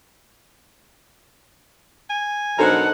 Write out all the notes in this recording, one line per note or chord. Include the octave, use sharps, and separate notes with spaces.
G#5
B2 F#3 D4 D#4 A4 A#4 C5 F#5